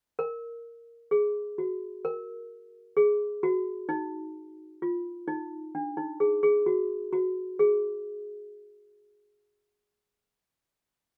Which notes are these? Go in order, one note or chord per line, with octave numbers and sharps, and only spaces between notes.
A#4
G#4
F#4
A#4
G#4
F#4
D#4
F4
D#4
D4
D#4
G#4
G#4
F#4
F#4
G#4